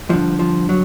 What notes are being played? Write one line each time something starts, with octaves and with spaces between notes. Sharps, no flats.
G2 D3 F3
F3
F#3